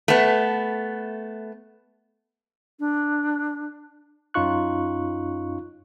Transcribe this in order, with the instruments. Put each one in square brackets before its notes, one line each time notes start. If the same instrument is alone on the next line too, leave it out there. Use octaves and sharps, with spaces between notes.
[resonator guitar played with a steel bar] A3 B3
[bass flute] D4
[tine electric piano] F#2 C#4 D#4 F4 C#6 F#6